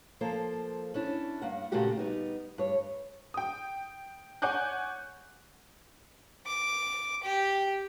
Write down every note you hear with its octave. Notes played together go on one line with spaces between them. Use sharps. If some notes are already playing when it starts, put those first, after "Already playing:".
F3 A#3 A4 C5
C#4 D4 E4
G2 A#3 F#5
A#2 C#3 A3 A#3 F#4 G4
G3 B3 D#4
G2 C#5
G5 D#6
C#5 F#5 G#5 D6 F#6 G6
D6
G4